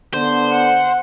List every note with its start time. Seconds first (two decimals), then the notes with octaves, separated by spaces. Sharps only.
0.14 D3 B3 C5
0.52 F#5